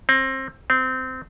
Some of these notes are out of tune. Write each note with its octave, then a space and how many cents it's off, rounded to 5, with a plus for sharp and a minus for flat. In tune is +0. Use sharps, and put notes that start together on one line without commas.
C4 +25
C4 -20